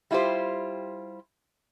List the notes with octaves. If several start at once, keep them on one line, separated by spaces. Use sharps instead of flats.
G3 E4 F4 G4 C5